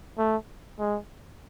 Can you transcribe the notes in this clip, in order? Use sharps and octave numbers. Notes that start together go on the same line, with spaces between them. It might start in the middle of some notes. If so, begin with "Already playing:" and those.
A3
G#3